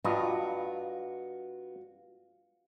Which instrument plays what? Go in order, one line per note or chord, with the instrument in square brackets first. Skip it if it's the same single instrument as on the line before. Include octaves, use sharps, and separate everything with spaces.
[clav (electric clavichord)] G2 D#5 A#5 [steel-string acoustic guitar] F4 F#4